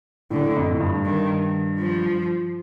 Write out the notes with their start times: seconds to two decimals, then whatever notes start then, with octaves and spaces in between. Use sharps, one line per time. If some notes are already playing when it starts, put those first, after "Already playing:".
0.30 A2 D3
0.56 F2
0.71 A2
0.80 G2
1.05 D#3
1.79 F3